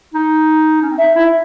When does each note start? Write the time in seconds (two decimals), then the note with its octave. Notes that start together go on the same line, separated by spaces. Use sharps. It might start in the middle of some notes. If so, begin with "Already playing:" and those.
0.14 D#4
0.82 C#4
0.90 C4
0.98 D#4 E5
1.16 E4